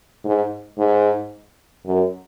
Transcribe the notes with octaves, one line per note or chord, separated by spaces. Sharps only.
G#2
G#2
F#2